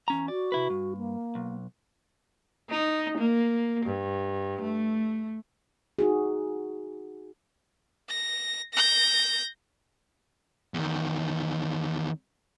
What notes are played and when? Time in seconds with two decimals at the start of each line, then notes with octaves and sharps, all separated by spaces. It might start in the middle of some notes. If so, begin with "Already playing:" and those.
0.08 E2 C#4 A#5
0.28 F#4 D5
0.52 C3 E4 B4
0.70 G2
0.97 A#3
1.35 B1
2.70 D#4
3.18 A#3
3.86 G2
4.61 A3
5.99 D#4 F#4 G#4
8.09 A#6
8.73 G6 A#6
10.74 E2 D#3